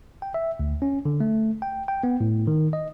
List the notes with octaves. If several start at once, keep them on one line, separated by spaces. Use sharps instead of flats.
G5
E5
D2
C#4
D3
A3
G5
G5
B3
A2
D#3
D#5